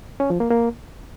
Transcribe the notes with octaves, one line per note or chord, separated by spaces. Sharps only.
C#4
F3
A#3
A#3